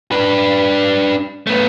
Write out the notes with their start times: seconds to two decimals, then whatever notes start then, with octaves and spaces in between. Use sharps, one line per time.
0.12 D4 B4
1.47 A3 B3